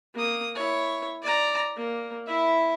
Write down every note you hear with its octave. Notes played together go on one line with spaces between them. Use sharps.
A#3 D#6
E4 C#5
D5 A#5
A#3
E4 E5